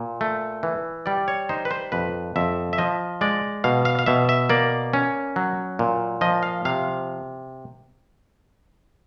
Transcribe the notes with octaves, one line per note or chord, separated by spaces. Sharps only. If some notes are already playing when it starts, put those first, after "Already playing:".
Already playing: A#2
A3
E3
G3 D5
C#5
D#4 C5
B4
C5
F2 B4
F2 E5
E5
F3 D#5
G#3 D5
B2 F5
F5
F5
B2 E5
E5
A#3 D5
C#4
F#3
A#2
F3 D#5
F5
C3 F5